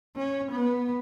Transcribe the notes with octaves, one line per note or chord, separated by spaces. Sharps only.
C#4
B3